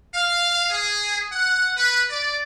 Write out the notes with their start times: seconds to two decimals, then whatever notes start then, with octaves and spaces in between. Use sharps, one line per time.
0.14 F5
0.71 G#4
1.32 F#5
1.77 B4
2.09 D5